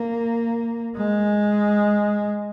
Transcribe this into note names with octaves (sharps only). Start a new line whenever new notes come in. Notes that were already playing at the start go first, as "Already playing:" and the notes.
Already playing: A#3
G#3